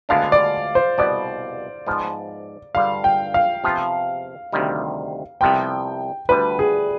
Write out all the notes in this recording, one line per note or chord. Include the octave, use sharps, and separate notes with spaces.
D2 D3 G#3 B3 D4 F5
D5
C5
C2 B2 B3 D5
G#2 F3 B3 F4
G2 D3 G3 F5
G5
F5
C3 F3 B3 F4
D2 C3 D#3 G3
C2 C3 F3 B3 G5
D2 D3 G3 B4
G#4